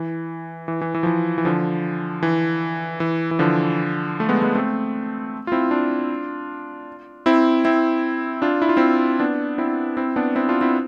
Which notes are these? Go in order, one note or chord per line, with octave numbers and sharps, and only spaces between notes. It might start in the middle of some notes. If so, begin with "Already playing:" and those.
Already playing: E3
E3
E3
E3
F3
E3
E3
D3 F3
E3
E3
E3
D3 F3
A3
G#3 B3
G#3 B3
A3 C4
F4
C4 E4
D4 F4
C4 E4
C4 E4
D4 F4
E4
F4
C4 E4
B3 D4
C4 E4
C4 E4
B3 D4
C4 E4
D4 F4
C4 E4